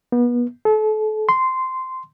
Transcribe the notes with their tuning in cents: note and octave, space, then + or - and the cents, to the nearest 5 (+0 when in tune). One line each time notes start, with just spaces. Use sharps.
B3 -30
A4 -35
C6 -10